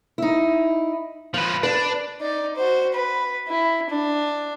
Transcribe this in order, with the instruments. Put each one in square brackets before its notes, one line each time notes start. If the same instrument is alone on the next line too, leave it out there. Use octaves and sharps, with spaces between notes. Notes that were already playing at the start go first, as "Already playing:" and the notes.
[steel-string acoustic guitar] D#4 E4
[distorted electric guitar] F3 B4 [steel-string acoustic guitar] F4
[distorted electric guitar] D4 [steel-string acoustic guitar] B4
[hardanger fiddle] D#4 D5
F#4 C5
B4
E4
D4